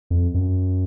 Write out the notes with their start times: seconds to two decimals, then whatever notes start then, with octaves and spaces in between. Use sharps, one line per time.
0.10 F2
0.34 F#2